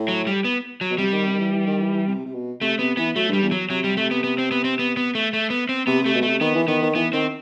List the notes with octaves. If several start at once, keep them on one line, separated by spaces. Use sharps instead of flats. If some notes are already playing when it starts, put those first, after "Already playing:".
Already playing: A2
F#3
G3
B3
F#3
B2
C3 G3
D#3
C3
D#3
E3
E3
D#3
E3
E3
C3
C3
B2
C3 A3
C3 B3
E3 B3
F#3 A3
G2 G3
E2
F#3
C3 F#3
G3
A3
B3
B3
C4
B3
C4
B3
B3
A3
A3
B3
C4
C3 B3
C3
A3
B2
A3
C3
D#3 B3
E3
D#3 B3
D#3
E3 B3
D#3 C4